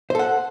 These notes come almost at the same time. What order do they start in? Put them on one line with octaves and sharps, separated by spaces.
C5 A4 F#5